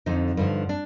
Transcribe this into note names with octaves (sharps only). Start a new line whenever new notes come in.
F2 D3 F3 D#4
G2 D3 F3
D4